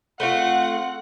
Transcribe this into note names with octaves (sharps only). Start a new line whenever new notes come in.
A3 C4 F4 F#5